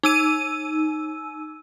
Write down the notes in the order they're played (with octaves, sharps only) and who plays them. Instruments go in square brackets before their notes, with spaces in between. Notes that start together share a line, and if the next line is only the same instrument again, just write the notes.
[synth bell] D#4 E6 D#7